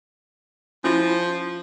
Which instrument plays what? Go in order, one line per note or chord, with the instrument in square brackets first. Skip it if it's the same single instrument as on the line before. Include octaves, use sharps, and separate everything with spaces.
[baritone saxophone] F3 [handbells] C#4 E4 F4